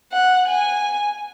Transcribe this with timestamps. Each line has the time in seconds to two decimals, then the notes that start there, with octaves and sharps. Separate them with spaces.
0.12 F#5
0.48 G#5